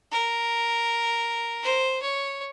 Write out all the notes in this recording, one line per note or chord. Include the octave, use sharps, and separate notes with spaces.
A#4
C5
C#5